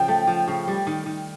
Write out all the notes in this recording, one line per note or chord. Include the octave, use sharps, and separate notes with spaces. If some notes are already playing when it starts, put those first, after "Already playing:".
Already playing: C#3 F3 G5
A3
F3
C#3
G3
D#3
D#3